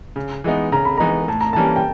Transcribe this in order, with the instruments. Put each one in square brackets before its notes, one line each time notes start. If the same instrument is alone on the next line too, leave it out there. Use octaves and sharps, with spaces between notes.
[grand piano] C#3
E3 G#3 B3 D#4
[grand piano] C#3 [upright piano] A#5
[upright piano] B5
[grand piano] E3 G#3 B3 D#4 [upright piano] A#5
[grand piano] A2 [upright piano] A5
[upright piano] A#5
[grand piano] E3 G3 A#3 C#4 [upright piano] A5
[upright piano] G5